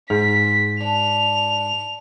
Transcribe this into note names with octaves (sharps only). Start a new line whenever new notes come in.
G#2 G#4 B6
D4 F7